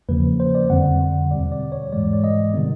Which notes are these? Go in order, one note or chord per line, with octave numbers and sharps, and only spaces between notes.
E2 C#3 F3 A#3 B4
C5
D5
F2 D3 G3 C4 F#5
E2 B2 G3 D5
D5
C#5
G#2 E3 G#3 D5
D5
D#5
C3 D#3 G3 B3